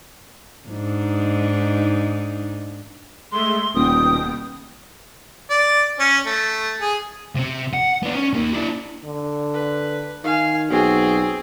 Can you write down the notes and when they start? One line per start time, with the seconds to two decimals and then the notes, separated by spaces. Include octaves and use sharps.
0.69 G#2 D4 D#4
3.32 G#3 A3 E5 C6
3.75 D#1 B2 G5 D#6
5.50 D5
5.99 C#4
6.26 A3
6.81 G#4
7.36 C3 C4
7.73 F#5
8.03 B3 D4
8.15 C#4
8.33 D#2 A#3
8.53 D4 E4
9.05 D3
9.54 B4
10.24 D#3 F5 G#5
10.71 B1 C4 F#4 G#4